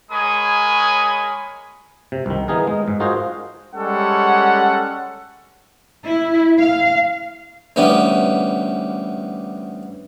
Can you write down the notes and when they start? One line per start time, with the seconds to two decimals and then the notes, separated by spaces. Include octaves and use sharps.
0.11 G#3 A#4 C#5 G#5 B5 D#6
2.12 C3
2.26 C2 D#3
2.48 E3 B3 D#4 G#4 A#4
2.67 G#3
2.88 G#2
3.00 D#4 F4 F#4 G#4 A#4 C5
3.74 G3 G#3 C#4 A4 F#5
6.05 E4
6.59 F5
7.76 D2 E3 G3 B3 C#4